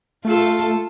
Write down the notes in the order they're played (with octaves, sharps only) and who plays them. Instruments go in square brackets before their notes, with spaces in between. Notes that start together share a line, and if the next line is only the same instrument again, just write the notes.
[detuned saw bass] A3 [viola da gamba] F4 A4